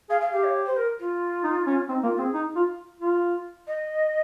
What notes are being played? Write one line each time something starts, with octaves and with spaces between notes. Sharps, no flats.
G#4 F5
F5
G4 F5
C#5
C5
A#4
F4
D#4
C#4
C4 D#4
A#3 F4
C4 G#4
D#4
F4
F4
D#5